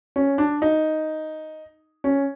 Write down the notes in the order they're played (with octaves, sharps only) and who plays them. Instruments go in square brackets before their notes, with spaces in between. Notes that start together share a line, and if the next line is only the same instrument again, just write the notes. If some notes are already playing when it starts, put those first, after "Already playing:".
[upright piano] C#4
D4
D#4
C#4